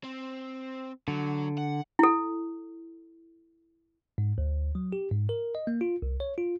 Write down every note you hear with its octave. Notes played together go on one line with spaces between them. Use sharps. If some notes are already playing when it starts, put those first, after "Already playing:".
C4
D3 F#3
F#5
E4 A4
G#2
D2
F#3
G4
G#2
A#4
D#5
A#3
F4
C2
C#5
F4